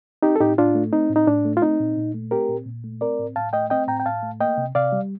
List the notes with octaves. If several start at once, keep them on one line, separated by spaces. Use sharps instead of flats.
C4 D#4 G4
A4
A2 D#4 G4
A2 D4 F4
A3
C4 D#4
A2
D#4
A2 D4
A3
F4
C4 D#4
A#2
A#2
A3
C4 G4 A#4
A#2
A#2
A3
C4 A#4 D5
A2
A2 F5 A5
A3 D#5 G5
C4 D#5 G5
A2 G5 A#5
G5
A2 F5 A5
A3
A#3 D#5 G5
C3
C3 D5 F5
G3